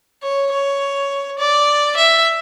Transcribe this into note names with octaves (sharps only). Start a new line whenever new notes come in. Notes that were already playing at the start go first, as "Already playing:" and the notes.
C#5
C#5
D5
E5